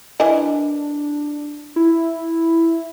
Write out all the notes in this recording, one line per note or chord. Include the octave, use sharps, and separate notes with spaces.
E3 D4 A#4 D#5
E4